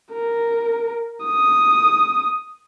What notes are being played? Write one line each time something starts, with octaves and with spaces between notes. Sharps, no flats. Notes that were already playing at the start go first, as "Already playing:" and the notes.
A#4
D#6